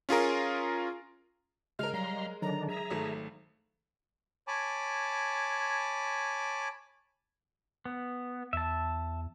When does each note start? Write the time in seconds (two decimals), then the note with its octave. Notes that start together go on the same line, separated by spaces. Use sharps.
0.09 C#4 F4 G#4 A#4
1.79 C#3 G#3 A#4 F6
1.94 F#3 G3 F5 A#5 C6
2.42 D3 D#3 F#3 D4 A#5
2.68 G#4 E5 A#5
2.90 G#1 A3
4.47 C#5 G#5 A5 B5 D6
7.85 B3
8.53 E2 E5 A5